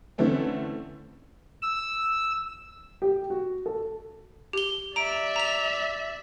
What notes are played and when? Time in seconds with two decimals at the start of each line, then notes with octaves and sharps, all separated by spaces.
0.18 D3 E3 A3 C4 C#4
1.62 E6
3.02 G4
3.30 F#4
3.66 A4
4.53 G4 G7
4.96 D5 E5 A#5 D7
5.36 A#5 F7